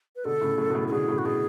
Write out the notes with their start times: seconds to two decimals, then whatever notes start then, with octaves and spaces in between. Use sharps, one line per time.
0.16 B4
0.25 B2 D3 A4
0.41 A2 C#3
0.58 F#2 A2
0.70 B2
0.75 A2 C#3
0.88 A4
0.91 B2 D3 G#4
1.08 A2 C#3
1.18 F#4
1.25 B2 G#4